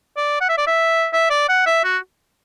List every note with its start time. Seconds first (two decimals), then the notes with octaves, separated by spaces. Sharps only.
0.17 D5
0.41 F#5
0.49 E5
0.58 D5
0.67 E5
1.13 E5
1.30 D5
1.49 F#5
1.66 E5
1.84 F#4